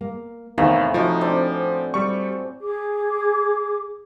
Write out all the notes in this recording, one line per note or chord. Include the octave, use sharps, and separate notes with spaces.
A#3
E2 A2 C3 D#3 F5 G#5
F3 D#4 F#4 D#5
C4 D4
G3 C#6
G#4 D6